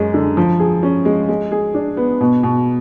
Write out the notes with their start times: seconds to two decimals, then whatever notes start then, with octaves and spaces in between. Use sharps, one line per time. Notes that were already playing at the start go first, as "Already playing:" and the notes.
Already playing: F#2 G#3 C#4
0.14 D3
0.37 F3
0.60 G#4
0.83 C#4
1.05 G#3
1.29 G#3
1.52 G#4
1.74 D4
1.97 B3
2.21 B2
2.43 B2